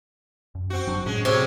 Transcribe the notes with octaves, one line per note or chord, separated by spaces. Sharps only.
F#2
C4 F#4
F#1 F#3 D4
A2 G#3 C#4
C3 F#3 G#4 C#5